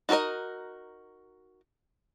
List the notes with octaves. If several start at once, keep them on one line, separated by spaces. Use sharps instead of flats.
D#4 F#4 A4 A#4 D#5